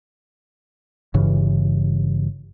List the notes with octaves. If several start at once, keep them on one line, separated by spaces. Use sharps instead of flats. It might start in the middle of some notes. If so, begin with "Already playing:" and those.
G1 G2 C#3 E3